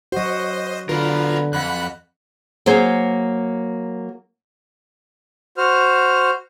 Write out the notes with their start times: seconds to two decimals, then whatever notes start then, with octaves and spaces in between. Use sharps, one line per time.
0.12 F#3 F#4 C5 D#5
0.89 D3 B3 F4 A#4 B4
1.53 F2 F#5 B5 F#6
2.66 F#3 A#3 G#4 C5
5.57 F#4 C5 F6